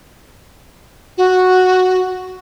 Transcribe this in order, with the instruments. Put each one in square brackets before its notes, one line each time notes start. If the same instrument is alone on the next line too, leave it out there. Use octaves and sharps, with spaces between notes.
[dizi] F#4